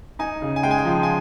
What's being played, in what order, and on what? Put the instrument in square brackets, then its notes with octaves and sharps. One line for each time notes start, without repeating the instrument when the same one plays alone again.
[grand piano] D#4 [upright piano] G#5
[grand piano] C#3
[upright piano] G#5
[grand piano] G#3 [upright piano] G5
[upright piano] G#5
G5
[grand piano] F3
[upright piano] G#5